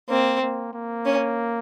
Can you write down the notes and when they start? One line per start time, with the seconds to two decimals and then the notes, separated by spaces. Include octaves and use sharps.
0.09 A#3 C4
0.42 A#3
0.73 A#3
1.06 C#4